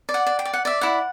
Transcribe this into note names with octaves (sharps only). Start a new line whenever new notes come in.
D5
F#5
D5
G5
D5
F#5
D5 E5
E4 F#5